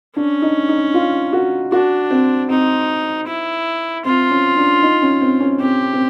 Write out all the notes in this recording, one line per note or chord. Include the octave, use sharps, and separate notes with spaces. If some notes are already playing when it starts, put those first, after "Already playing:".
C#4 D4
D#4
D#4
F4
F#4
D4 F#4
C4
C4 D#4
E4
C4 F4
C#4
D4
D#4
C#4
C4
C#4
C4 G4
C4